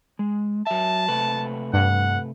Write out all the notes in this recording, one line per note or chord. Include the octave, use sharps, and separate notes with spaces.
G#3
F#3 E5 A5
C3 A3 B4
G2 F#5